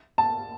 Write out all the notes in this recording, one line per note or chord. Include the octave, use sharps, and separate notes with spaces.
A5